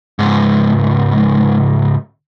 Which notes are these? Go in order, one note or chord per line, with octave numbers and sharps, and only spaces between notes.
C#2 G#2